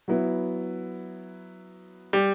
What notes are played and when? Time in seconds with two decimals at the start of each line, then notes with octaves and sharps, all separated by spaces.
0.08 F#3 B3 E4
2.13 G3